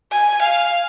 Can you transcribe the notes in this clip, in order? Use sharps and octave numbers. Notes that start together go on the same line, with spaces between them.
G#5
F5